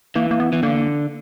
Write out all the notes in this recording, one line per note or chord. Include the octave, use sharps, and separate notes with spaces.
E3 A#3
A#3
B3
E3
D3 A#3